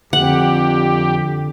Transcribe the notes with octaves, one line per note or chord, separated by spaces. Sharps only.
F2 D3 G4 F#5